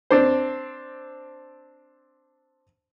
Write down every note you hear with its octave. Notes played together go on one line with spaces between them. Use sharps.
C4 D4 C5